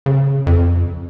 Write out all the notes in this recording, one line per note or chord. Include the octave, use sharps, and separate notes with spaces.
C#3
F2